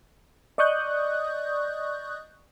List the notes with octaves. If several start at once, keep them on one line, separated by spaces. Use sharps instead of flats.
D5 D#5 C#6 D#6 F#6 G6